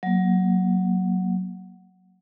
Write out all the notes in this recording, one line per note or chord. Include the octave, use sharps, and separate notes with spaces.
F#3 A#3